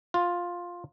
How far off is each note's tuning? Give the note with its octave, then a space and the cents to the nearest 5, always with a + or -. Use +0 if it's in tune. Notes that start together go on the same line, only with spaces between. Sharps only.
F4 +5